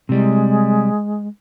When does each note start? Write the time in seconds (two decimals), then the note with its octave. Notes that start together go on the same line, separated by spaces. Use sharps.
0.09 C3 G3 G#3